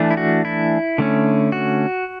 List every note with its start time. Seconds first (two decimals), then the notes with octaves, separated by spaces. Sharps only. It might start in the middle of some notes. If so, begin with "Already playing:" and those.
Already playing: E3 A3 D4
0.11 E4
0.17 F#4
0.45 E4
0.98 D3 A3 C#4
1.52 F#4